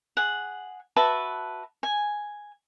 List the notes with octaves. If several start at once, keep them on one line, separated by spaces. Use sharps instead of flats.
G#4 F#5
F#4 B4 E5 A5
G#5